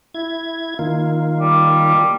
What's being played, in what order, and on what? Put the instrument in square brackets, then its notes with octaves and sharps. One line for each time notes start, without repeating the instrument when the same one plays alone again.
[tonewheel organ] E4 G#6
D#3 A#3 F4
[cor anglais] G3